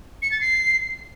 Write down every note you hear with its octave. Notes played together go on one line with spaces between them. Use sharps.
C#7
A6
C7